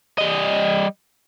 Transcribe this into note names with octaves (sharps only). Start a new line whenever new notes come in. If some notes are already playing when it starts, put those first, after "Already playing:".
G3 D#5